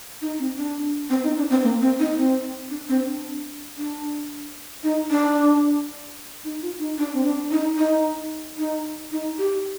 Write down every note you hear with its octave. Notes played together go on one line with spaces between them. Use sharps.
D#4
C4
D4
C4
D#4
D4
C4
A#3
C4
D#4
C4
D4
C4
D4
D4
D#4
D4
D#4
F4
D#4
D4
C4
D4
D#4
D#4
D#4
D#4
G4